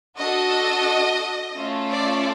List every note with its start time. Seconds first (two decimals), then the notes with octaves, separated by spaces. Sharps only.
0.18 D4 F#4 A4 D#5
1.57 A3 C#4 F4 A4
1.92 D5